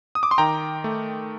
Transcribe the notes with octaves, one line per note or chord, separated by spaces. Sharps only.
D#6
D6
C6
D#3 G5 A#5
A3